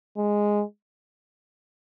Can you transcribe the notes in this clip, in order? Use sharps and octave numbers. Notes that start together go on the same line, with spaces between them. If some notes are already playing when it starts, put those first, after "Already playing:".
G#3